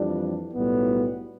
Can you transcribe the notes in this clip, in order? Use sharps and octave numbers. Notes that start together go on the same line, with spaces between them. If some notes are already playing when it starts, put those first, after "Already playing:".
Already playing: F2 E3 G3 D4
B1 A2 G3 B3